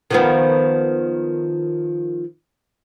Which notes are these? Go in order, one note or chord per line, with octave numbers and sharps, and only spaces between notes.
D#3 F3 B3